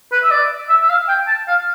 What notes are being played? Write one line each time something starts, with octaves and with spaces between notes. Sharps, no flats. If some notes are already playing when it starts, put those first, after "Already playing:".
B4
E5
D5
E5
E5
F5
G5
A5
F5